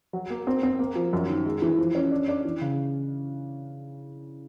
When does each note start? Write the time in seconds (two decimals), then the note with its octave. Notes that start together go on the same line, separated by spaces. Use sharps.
0.13 F#3
0.30 A#3
0.47 C4
0.63 C4
0.79 A#3
0.95 F3
1.13 F#2
1.28 D#3
1.46 G#3
1.62 E3
1.78 F3
1.95 C#4
2.11 D4
2.28 D4
2.45 E3
2.61 C#3